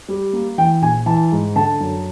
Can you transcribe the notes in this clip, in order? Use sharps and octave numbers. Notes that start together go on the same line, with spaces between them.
G3
A#3
E3 G5
A#1 G#5
E3 A5
G#2
D3 A5
F#2